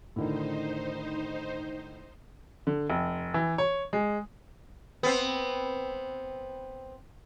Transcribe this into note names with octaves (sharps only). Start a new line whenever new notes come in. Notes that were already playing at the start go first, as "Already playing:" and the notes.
A2 D3 D#3 D#4 C5
D3
F1
E3
C#5
G#3
B3 C4